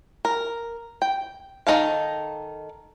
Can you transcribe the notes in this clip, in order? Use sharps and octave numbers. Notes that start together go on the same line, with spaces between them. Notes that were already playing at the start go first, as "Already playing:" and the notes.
A#4
G5
D#3 F#3 D#4 A4 F5